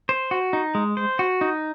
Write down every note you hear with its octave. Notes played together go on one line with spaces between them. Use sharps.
C5
F#4
D#4
G#3
C5
F#4
D#4